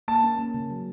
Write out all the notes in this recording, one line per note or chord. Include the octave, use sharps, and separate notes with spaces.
A#3 A5
C#4
A#3
C#3
F#3